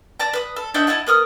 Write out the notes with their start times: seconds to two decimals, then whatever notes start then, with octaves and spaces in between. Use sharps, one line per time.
0.20 D5 A5 A#5
0.33 B4 D#6
0.56 A4
0.74 D4 D#4 F#4 E5
0.87 E4 D#5 F#5 A5
1.07 B3 A#4 D#6 F6